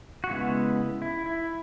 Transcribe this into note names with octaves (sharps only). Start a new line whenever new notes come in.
F#4
C#3 G#3 B3 E4
E4
E4